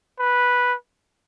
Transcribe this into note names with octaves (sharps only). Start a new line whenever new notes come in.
B4